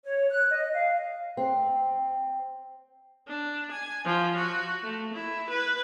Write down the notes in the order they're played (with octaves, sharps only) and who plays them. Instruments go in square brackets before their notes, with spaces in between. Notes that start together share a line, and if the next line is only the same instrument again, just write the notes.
[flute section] C#5
F#6
D#5
F5
[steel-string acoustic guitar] C4
[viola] D4
G#5
F3
F#4
A3
E4
B4